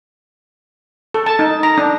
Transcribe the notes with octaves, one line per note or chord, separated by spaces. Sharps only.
A4
A5
D#4
A#5
D4